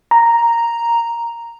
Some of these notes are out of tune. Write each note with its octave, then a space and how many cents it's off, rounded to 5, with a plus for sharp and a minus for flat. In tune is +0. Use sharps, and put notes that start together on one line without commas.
A#5 +0